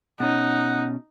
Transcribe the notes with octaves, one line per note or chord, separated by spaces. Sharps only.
B2 C#4 D#4 F#5